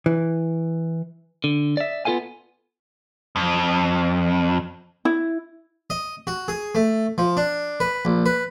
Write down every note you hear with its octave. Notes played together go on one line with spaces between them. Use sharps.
E3
D3
D5 E5
B3 F4 A4 F5 G#5
F2
E4
D#5
F#4
G#4
A3
F3
D4
B4
A#1
B4